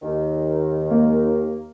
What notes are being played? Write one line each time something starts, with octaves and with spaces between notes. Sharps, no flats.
D#2 D#3
A#3